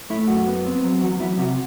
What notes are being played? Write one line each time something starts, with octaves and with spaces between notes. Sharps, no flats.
A3 E4
F#2 F#4
B3
C4
F#3
E2 F#4
F#3 E4
C3 F#4